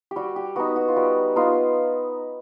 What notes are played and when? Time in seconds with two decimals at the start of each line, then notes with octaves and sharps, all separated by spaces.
0.11 G4
0.16 G3 F#4
0.36 G4
0.56 B3 D#4 F#4
0.76 F#4
0.88 F4
0.96 G3 F#4
1.36 B3 D#4 F4